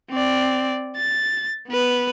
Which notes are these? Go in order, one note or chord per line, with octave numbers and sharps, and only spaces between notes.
C4 D5
A6
B3 B4